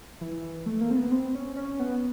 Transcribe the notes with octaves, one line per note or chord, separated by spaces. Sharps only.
E3
A3
A#3
C4
B3
C4
C#4
C#4
B3